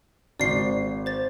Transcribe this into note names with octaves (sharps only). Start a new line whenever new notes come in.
G#1 G#2 D5 C7
C5 A6